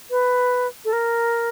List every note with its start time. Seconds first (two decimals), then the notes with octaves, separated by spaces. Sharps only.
0.11 B4
0.85 A4
0.93 A#4